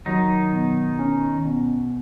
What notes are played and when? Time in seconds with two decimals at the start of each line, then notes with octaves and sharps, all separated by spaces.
0.06 D#3 F#3 D#4
0.53 B2
0.99 C#4
1.45 B2